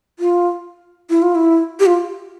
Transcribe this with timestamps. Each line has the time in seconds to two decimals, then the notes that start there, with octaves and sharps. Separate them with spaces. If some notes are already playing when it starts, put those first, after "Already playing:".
0.19 F4
1.10 E4
1.22 F4
1.35 E4
1.80 G4
1.86 F4